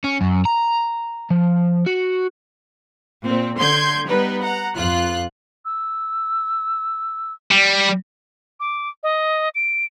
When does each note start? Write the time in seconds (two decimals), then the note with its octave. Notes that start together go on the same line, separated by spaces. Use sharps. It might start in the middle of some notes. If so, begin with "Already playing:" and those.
0.04 C#4
0.21 F#2
0.45 A#5
1.31 F3
1.86 F#4
3.26 A#2 C4
3.58 D3 C6 G6 G#6
4.08 G3 B3 D#4 B4
4.42 F#5 A#5
4.77 F2 F4 F#6
5.65 E6
7.51 G3
8.60 D6
9.03 D#5
9.55 D7